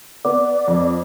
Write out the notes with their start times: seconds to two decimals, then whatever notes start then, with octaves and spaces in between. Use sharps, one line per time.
0.25 B3 D5
0.68 F2